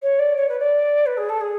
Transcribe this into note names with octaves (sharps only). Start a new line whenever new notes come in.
C#5
D5
C#5
B4
D5
B4
G#4
A4
G#4